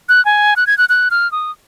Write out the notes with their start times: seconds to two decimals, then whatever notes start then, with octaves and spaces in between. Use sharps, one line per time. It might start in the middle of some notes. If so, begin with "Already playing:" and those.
0.09 F#6
0.25 G#5
0.56 F#6
0.67 G#6
0.78 F#6
0.89 F#6
1.11 F6
1.32 D#6